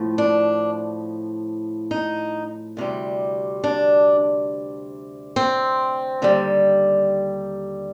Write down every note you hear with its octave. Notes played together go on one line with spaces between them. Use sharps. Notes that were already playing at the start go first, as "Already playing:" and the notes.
Already playing: A2 F3
D4
D#4
D2 C3 G3
D4
C4
D#2 D3 G3